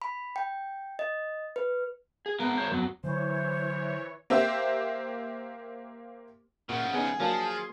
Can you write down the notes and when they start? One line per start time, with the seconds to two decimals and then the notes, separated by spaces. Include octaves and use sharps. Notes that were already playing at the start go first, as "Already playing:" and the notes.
0.02 B5
0.36 G5
0.99 D#5
1.56 B4
2.26 G#4
2.40 G#3 B3 A#4
2.58 C5 C#5
2.72 F2 F#3 B3
3.04 D3 E3 F#3 C5 C#5
4.30 A#3 G4 C5 E5
6.69 A#2 C#3 F3 F#5
6.93 B3 C#4 D#4 G#4
7.20 F3 F#3 A#3 D4 A5
7.57 C6